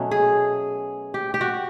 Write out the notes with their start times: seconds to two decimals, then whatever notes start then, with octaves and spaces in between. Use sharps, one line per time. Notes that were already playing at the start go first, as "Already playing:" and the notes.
Already playing: B2 F#3 A3 C#4
0.11 G#4
1.14 G4
1.34 G4
1.41 F#4